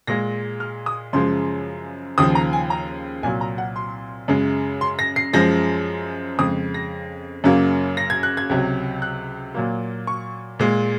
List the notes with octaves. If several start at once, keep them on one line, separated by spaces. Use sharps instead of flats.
A#2 G#3 A#6
F6
D#6
F#2 C#3 F3 G#3 C6
D#2 C#3 F3 D#6
A#5
G#5
A#5
C2 A#2 F#3 G#5
A#5
F#5
C6
F#2 C#3 G#3
C6
A#6
C7
F#2 F3 G#3 A#6
F2 C#3 G#3 D#6
A#6
F#2 C#3 F#3 A#3
A#6
G#6
F#6
G#6
C#2 C3 F#3
F#6
A#2 F#3 A#3
C#6
A#2 G#3